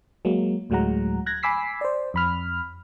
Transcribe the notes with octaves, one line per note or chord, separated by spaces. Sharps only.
F#3 G#3 A#3
D2 A2 F#3 G#3 F#5 A#5
F#6 G#6 A#6
G#5 B5 D6 E6 B6 C7
C5 D5
F2 B5 F6